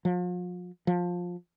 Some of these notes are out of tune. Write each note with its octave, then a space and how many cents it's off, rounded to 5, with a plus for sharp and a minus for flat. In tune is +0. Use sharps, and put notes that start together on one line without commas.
F3 +40
F3 +15